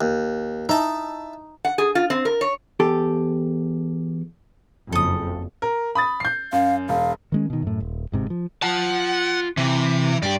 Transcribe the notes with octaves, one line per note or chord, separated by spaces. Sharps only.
D#2
D#4 E4 A5
F#5
G#4
F4
C4
A#4
C#5
E2 G4 A4
F#1 F2 A4 D#6
A#4
B5 D#6 A6
G6 C7
F#2 F5
E1 F5
D#3 G#3 C#4
B2 D#3
F#2 A2
D#1
G1 G#2 C3
F3
F4 F#5 A5
C3 E3
G2 G4 D5